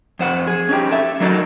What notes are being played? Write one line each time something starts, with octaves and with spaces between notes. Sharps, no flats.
F2 C5 F#5
G#4
C#4 D#4 G4
A4 E5
F#3 A3 D#4 A#4 D5